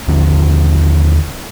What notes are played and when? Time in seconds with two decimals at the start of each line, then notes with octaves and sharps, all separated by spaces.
0.07 D#2 D3 F3 C#4